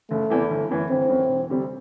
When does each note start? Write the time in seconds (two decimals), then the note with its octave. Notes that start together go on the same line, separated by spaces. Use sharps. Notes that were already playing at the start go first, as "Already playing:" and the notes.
0.11 F#1 A3
0.30 E2 C3 E3
0.50 G1
0.70 F#2 E3
0.90 G1 C4
1.09 F#2 E3
1.29 E1
1.49 D2 C3 G3 C4